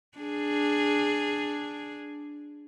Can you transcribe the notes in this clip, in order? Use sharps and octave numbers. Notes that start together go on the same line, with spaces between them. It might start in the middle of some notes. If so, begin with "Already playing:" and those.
D4 G#4